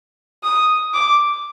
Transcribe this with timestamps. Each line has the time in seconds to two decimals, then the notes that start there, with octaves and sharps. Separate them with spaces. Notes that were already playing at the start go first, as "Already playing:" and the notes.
0.43 D#6
0.94 D6